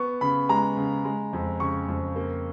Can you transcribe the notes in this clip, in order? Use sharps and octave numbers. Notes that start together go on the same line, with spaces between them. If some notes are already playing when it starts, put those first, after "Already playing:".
Already playing: B3 C#6
C#3 B5
G#3 A#5
C#3
G#3
F2
C#3 C#6
F2
A#3